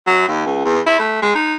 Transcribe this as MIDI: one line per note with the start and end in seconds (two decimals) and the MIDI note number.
0.07 0.27 54
0.28 0.46 39
0.46 0.61 37
0.65 0.79 40
0.87 0.98 64
0.99 1.21 57
1.22 1.31 56
1.35 1.56 63